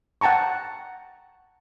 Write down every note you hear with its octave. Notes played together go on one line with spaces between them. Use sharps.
F#5 G5 A5 A#5 C#6